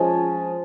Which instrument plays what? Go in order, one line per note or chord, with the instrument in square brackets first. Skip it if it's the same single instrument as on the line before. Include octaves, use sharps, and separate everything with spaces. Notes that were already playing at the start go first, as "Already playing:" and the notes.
Already playing: [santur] F3 G#3 C#4 F4